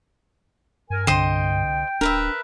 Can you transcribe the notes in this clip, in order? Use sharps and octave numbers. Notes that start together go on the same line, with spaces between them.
G2 A#4 G#5
C2 D3 C5 D#5 G5 C6
D1 D4 A#4 B4 E5